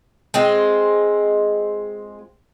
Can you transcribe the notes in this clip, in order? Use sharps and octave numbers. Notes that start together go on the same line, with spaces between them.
G#3 C4 F4